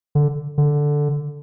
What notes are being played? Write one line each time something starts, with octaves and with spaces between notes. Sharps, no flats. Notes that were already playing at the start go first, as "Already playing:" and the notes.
D3
D3